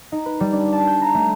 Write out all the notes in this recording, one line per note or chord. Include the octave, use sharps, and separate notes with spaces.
D#4
B4
G3
D4
A5
G6
A#5
A3